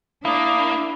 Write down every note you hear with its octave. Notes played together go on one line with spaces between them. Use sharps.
A#3 D4 E4 D#6